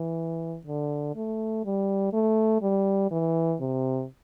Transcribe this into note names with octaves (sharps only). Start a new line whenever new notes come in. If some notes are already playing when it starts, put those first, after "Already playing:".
Already playing: E3
D3
A3
G3
A3
G3
E3
C3